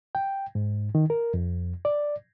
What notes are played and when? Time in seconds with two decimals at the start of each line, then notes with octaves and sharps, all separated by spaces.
0.15 G5
0.55 G#2
0.95 D#3
1.10 A#4
1.34 F2
1.85 D5